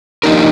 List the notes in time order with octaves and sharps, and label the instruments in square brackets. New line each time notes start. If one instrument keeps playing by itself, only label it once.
[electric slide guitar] F3 A#3 D4 G4 A#4 [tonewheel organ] D#4